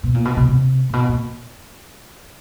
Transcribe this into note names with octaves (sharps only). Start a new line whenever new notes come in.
B2
A#2
B2
C3
C3
A#2
B2
A#2